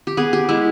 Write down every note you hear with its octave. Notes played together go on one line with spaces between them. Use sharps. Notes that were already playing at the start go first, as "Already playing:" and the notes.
G4
B3 G#4
G4
G#3 E4